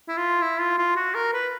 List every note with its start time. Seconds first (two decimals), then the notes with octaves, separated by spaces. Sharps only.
0.08 E4
0.17 F4
0.42 E4
0.60 F4
0.78 F4
0.96 F#4
1.15 A#4
1.33 B4